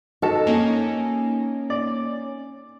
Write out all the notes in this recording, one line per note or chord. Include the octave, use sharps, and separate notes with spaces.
D#4 F#4 A4
A#3 C#4 D#4
D5